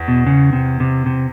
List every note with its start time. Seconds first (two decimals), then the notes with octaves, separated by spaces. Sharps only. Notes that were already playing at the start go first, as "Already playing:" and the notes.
Already playing: E2
0.08 B2
0.27 C#3
0.53 C3
0.80 C3
1.06 C3